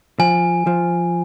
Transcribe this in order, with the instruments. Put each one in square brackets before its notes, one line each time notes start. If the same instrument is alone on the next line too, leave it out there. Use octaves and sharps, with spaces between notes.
[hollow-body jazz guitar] F3 [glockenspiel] G#5
[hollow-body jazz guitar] F3